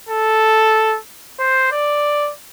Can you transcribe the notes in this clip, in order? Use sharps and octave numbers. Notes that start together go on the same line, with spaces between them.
A4
C5
D5